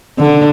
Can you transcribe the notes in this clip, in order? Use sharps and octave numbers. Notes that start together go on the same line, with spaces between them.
D3